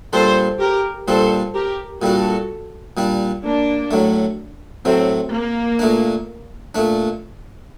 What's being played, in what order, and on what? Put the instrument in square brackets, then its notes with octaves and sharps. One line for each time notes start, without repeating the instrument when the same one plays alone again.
[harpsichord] A#2 G3 D4 [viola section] A4 C5
[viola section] G4 A#4
[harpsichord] A#2 G3 D4 [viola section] A4 C5
[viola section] G4 A#4
[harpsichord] A#2 G3 D4 [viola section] F#4 A4
[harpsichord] A#2 G3 D4
[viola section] A#3 D4
[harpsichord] A2 F#3 A3
[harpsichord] A2 F#3 A3 [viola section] C4
[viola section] A#3
[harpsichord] A#2 A3 D4
A#2 A3 D4